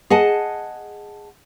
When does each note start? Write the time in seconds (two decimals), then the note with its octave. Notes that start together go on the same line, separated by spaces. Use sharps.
0.10 G#4 D#5 F#5 A5